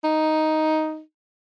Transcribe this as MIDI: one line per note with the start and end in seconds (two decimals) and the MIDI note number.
0.04 1.01 63